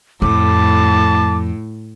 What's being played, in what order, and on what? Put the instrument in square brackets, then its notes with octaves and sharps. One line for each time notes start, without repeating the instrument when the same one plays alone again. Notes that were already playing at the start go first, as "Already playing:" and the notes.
[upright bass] F2 [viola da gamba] A2 [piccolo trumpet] A5 [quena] D6